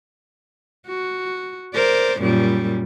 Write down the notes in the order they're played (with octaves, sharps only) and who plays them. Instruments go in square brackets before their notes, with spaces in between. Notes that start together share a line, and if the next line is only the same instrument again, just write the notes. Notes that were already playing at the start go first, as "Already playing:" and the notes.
[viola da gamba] F#4
A#4 C5 D5
F#2 A#2 G3